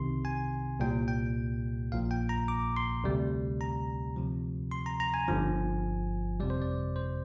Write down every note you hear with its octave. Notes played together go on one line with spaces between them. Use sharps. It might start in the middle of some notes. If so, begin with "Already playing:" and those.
Already playing: C2 C3 D#3 C6
G#5
C2 A#2 G3 G5
G5
A#1 A#2 F3 F5
G5
A#5
D6
C6
D2 C3 G3
A#5
D2 C3 F3
C6
A#5
A#5
G#5
G1 G2 D3 F3
F2 C3 G3 D5
C5
D5
C5